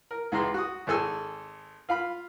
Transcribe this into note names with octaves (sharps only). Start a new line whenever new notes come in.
A#4
C#2 E3 G#3 A#5 C6
F#4 D#6
G#1 G#4 A4 G#5 E6
F4 F5 B5